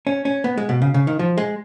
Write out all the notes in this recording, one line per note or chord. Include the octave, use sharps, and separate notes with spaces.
C#4
C#4
B3
G#3
B2
C#3
C#3
D#3
F3
G#3